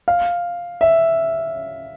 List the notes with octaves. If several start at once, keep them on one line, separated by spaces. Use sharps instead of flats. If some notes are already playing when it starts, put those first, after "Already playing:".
F5
E5